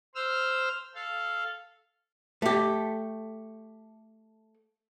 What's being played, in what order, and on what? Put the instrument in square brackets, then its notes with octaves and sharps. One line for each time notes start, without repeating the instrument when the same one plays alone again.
[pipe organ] C5 E6 F6
A4 F5
[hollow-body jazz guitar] A3 G4